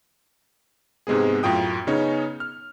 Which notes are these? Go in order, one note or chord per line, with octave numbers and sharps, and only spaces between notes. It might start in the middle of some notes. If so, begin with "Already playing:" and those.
G#2 C3 G#3 B3 G#4
F#2 A2 F4 G5 D#6
C#3 B3 C#4 D#4 C#5
F6